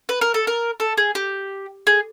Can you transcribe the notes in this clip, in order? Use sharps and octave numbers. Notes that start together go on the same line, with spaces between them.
B4
A#4
A4
A#4
A4
G#4
G4
G#4